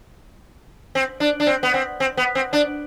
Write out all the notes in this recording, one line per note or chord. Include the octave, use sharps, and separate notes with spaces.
C4
D4
D4
C4
B3
C4
C4
B3
C4
D4